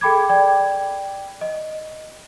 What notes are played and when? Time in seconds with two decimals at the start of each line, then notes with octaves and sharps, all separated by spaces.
0.01 G#4 A4 G5 B5 D6 G#6
0.29 D5 G5 G#6
1.41 D#5